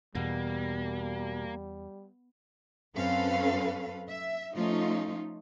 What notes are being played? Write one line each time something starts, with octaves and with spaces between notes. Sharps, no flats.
E2 B2 G3 A#3
F#2 C4 C#4 A4 B4 F5
E5
F3 A3 C#4 D#4 F4